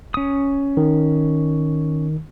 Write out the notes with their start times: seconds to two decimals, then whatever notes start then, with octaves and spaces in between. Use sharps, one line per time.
0.14 C#4 D#6
0.77 D#3